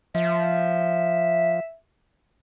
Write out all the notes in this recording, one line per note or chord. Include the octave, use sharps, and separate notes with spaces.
F3 E5